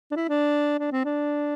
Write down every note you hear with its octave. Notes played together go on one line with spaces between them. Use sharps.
D4
E4
D4
D4
C4
D4